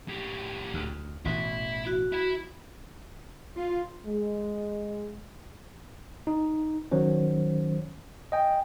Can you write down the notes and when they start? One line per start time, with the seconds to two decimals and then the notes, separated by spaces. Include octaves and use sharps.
0.08 A2 G4
0.74 D2
1.25 A1 B2 E3 E4 E5
1.87 F#4
2.12 E4 E5
3.56 F4
4.06 G#3
6.27 D#4
6.92 D#3 F#3 C#4 C5
8.32 D#5 G5 G#5